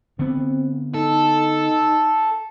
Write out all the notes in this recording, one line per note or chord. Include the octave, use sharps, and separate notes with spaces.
D3 B3 C4
D#4 A4